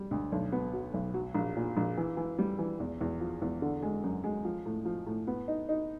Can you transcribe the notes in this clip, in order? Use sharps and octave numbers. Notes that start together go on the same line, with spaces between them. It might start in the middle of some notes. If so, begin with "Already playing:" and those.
Already playing: G3
D2
B1
B3
F#3
B1
F#3
A#1
A#2
A#1
E3
E3
G3
E3
E2
E2
F3
E2
D3
G#3
F#2
G#3
F3
A2
F3
A2
B3
D#4
D#4